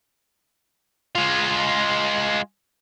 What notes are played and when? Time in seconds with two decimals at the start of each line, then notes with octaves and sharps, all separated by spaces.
1.15 G#3 F4